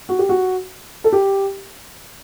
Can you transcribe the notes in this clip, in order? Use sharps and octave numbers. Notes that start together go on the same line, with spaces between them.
F#4
G4
F#4
A4
G4